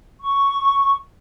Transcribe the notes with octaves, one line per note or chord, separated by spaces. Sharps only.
C#6